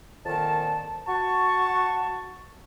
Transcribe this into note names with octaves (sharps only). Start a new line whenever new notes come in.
F2 A#2 D#3 A5
F#4 A5 C#6